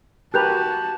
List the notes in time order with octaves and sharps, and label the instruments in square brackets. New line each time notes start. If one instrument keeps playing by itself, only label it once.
[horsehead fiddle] F#4 A5 [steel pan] G4 A#4 B4 [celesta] F#6 G6 F7